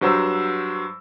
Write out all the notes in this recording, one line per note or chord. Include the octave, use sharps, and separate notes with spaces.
G2 F#3 C5 A#5 E6